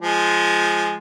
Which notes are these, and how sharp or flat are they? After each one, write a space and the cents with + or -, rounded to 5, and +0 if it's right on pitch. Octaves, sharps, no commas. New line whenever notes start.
F3 -10 G#3 +0